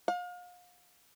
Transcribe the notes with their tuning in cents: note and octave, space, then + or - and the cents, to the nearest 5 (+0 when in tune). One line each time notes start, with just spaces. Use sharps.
F5 +35